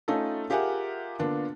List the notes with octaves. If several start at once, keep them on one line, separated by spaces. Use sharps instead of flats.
A3 C#4 D#4 F4 A4
F4 G4 G#4 A#4 E5 F#5
D3 A#3 B3 D4 F4